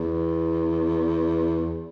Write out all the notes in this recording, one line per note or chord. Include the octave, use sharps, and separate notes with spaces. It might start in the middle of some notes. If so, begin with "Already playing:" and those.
Already playing: E2